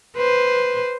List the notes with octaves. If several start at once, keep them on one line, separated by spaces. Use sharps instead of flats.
B4 C5